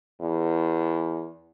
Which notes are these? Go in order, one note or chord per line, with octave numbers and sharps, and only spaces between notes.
E2